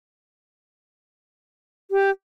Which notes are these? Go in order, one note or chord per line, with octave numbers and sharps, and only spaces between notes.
G4